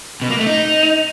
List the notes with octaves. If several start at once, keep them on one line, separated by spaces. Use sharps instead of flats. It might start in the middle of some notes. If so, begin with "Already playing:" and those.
B2
A#3
A3
D#4